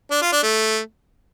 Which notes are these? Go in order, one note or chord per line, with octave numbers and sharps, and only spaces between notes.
D4
F4
D4
A3